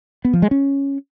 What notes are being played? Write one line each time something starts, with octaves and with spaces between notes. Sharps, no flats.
B3
F3
G#3
C#4